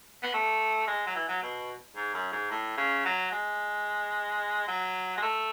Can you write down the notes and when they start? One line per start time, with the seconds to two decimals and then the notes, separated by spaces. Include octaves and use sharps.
0.23 B3
0.34 A3
0.87 G#3
1.07 F#3
1.15 E3
1.28 F#3
1.43 B2
1.96 G#2
2.14 F#2
2.32 G#2
2.51 A2
2.78 C#3
3.05 F#3
3.32 G#3
4.68 F#3
5.17 G#3
5.22 A3